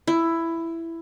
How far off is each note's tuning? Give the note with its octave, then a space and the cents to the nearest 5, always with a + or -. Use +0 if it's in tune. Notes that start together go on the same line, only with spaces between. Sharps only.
E4 +10